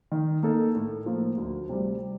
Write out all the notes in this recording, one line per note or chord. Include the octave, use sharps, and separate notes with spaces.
D#3
A#3 D#4 A4
A2
F3 A#3
D2
C3 G3